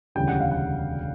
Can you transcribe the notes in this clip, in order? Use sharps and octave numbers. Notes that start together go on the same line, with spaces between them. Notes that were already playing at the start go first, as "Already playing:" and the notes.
E1 D2 C#3 E3 G3 G5
F#5
F5
F#5